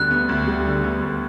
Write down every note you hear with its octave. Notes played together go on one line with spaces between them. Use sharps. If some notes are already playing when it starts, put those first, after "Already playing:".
Already playing: D2 D3 G3 B3 F#6
B3
D2
G3
D3
B3
D2